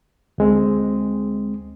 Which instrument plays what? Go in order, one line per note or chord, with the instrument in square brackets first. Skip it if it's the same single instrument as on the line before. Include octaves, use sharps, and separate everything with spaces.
[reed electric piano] D2 G#3 C4